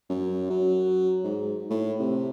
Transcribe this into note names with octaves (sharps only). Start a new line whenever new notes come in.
F#2
F#3
G#2
A2
C3